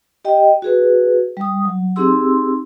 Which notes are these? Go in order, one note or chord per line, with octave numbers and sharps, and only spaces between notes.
G4 D#5 G5
F#4 G#4 B4
G3 D#6
F#3
C4 D#4 G4 G#4 C6 E6